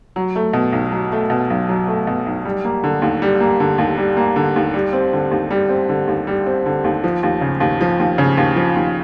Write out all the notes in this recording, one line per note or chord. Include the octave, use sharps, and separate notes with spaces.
F#3
A3
B2
B1
F#3
A3
B2
B1
F#3
A3
B2
B1
G3
A#3
D3
D#2
G3
A#3
D3
D#2
G3
A#3
D3
D#2
G3
C4
D3
D#2
G3
C4
D3
D#2
G3
C4
D3
D#2
F3
D#2
C#3
D#2
F3
D#2
C#3
D#2
F3
D#2